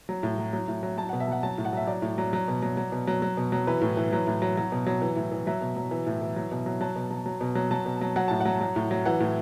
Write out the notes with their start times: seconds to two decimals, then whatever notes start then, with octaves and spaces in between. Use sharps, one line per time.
0.09 F#3
0.23 A2
0.38 F#3
0.53 F#3
0.68 A2
0.83 F#3
0.97 F#3 A5
1.09 F#5
1.13 B2
1.20 E5
1.28 F#3 F#5
1.43 F#3 A5
1.58 A2
1.65 F#5
1.73 F#3 E5
1.87 F#3 D5
2.02 A2
2.18 F#3
2.33 F#3
2.48 B2
2.62 F#3
2.77 F#3
2.92 B2
3.07 F#3
3.22 F#3
3.37 B2
3.52 F#3
3.67 E3 B4
3.81 A2
3.97 E3
4.13 F#3
4.27 A2
4.42 F#3
4.57 F#3
4.72 B2
4.86 F#3
5.02 E3
5.16 A2
5.32 E3
5.46 F#3 E5
5.61 B2
5.76 F#3
5.91 E3
6.07 A2
6.22 E3
6.36 F#3
6.52 B2
6.66 F#3
6.81 F#3 A5
6.96 B2
7.11 F#3
7.26 F#3
7.41 B2
7.55 F#3
7.71 F#3 A5
7.86 B2
8.01 F#3
8.16 F#3 F#5
8.28 A2 A5
8.40 F#5
8.45 F#3
8.61 F#3
8.76 A2
8.91 F#3
9.05 E3 F#5
9.20 A2